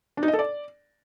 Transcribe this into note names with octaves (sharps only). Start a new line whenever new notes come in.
D4
D#4
D#5
A4
D5